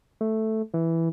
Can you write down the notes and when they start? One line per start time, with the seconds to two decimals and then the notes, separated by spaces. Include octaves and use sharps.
0.21 A3
0.74 E3